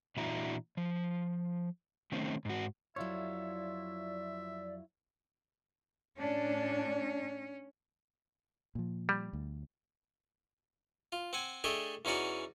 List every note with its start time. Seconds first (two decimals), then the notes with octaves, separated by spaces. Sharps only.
0.17 A#2 E3 D4 E4 F#4 A#5
0.77 F3
2.12 D#3 A3 C4 C#4
2.45 G#2 F#4
2.96 F2 F#3 E4 F4 C#5 D5 E5
6.18 A2 C#4 D4
8.75 A#2 F3
9.09 G3
9.33 D2
11.12 F4
11.33 C4 F#5 G#5
11.64 A3 D4 G4 G#4 D#5 E5
12.05 E2 C#4 D#4 F#4 D5 C#6